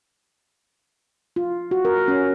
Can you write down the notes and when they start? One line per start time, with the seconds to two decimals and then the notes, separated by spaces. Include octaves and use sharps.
1.36 F4
1.71 F#4
1.85 A#4
2.08 C#4